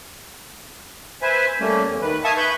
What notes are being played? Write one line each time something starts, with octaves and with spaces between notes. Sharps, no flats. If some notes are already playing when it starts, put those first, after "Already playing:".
B4 C5 E5 G#5
G3 A3 A#3 C#4
E2
D#3 B4
E5 F5 G#5 A5 C#6 D#6
B4 B5 C#6 G6